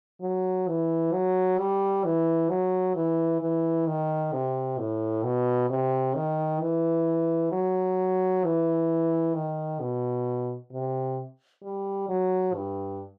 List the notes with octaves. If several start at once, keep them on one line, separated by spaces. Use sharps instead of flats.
F#3
E3
F#3
G3
E3
F#3
E3
E3
D#3
C3
A2
B2
C3
D#3
E3
F#3
E3
D#3
B2
C3
G3
F#3
G2